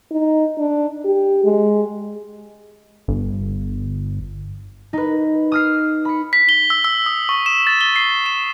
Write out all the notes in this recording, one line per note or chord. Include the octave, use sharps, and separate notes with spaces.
D#4
D4
G4
G#3
G1
D#4 B4
D#6 F6 C7
B5 C#7
B6
G7
E6
E6
D#6
C#6
E7
A6
G7
C7
E7